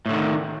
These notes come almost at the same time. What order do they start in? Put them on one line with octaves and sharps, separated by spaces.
A2 D3 D#3